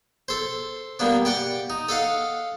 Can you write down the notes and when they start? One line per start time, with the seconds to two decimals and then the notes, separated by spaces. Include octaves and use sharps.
0.28 A4 C5
0.99 G3 A#3 B3 D4
1.25 G4 D5 F#5 G5
1.70 D#4
1.89 A4 D#5 F5 F#5